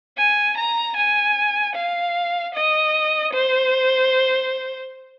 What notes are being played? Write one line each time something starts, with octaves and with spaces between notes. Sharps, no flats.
G#5
A#5
G#5
F5
D#5
C5